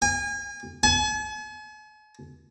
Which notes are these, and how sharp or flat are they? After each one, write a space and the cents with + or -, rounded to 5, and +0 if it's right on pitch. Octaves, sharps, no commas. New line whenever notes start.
G#5 -35
G#5 +45